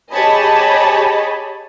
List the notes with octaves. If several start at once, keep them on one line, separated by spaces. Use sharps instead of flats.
G4 G#4 C#5 D#5 A5 B5